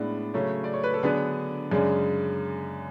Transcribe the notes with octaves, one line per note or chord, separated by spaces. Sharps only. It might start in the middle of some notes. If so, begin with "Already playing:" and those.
Already playing: A2 G#3 B3 D4
C#3 F#3 A3 C#4
D5
C#5
B4
A4
D3 F#3 B3 D4 G#4
F#2 C#3 G#3 D4